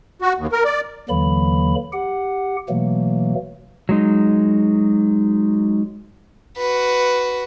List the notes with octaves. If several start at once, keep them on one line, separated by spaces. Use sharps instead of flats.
F#4
D#2
A#4
D5
D#2 D3 E3 F#3 A#3 B5
G4 F#5
B2 E3 F#3 A3 A#3
F#3 G#3 D#4
F#4 B4